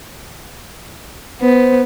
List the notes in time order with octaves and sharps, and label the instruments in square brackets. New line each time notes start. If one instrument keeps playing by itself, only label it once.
[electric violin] B3 [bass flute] C5